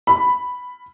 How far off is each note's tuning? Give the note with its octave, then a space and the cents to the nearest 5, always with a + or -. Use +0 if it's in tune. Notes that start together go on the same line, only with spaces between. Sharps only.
B5 +5